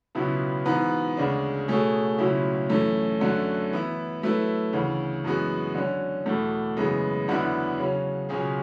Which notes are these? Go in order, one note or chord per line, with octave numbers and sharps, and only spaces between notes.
C#2 B2 F#3 B3 E4
G#2 E3 B3 F#4 B4
D2 C#3 G#3 D4
B2 A3 C#4 G#4
C#2 B2 F#3 C#4 E4
F#2 E3 A3 C#4
F#2 D3 A3 C#4 F#4
E3 B3 E4
F#3 A3 E4 B4
D2 C#3 E3
F#2 E3 G#3 B3 F#4
D3 F#3 C#4
E2 B2 A3
F#2 C#3 E3 G#3 B3
E2 D3 F#3 B3 E4
C#3 F#3 C#4
C#2 B2 F#3 C#4 G#4